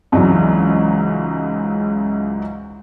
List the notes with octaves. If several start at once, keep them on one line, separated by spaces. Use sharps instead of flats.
C#2 G#2 E3 F#3 D5